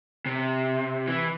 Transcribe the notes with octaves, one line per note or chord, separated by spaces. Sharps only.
C3
E3